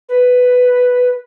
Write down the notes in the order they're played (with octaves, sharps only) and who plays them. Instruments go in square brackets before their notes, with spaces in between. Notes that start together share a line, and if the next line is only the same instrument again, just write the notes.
[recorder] B4